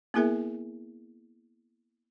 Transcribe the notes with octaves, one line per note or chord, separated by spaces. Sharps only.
A#3 B3 E4 G#4 A#4 E5